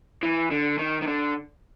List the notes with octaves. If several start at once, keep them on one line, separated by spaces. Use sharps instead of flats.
E3
D3
D#3
D#3
D3